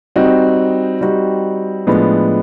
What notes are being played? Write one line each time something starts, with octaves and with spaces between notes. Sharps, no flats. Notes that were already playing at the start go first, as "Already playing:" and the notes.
G3 C4 D#4 F#4
G3 C4 D#4 F#4
A2 F3 G#3 B3 D4